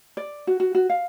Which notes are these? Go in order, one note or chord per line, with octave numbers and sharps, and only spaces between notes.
D5
F#4
F#4
F#4
F5